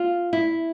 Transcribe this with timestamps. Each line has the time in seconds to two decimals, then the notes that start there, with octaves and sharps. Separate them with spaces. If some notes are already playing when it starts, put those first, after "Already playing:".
Already playing: F4
0.33 E4